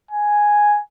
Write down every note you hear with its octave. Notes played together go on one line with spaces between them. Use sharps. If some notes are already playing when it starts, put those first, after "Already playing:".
G#5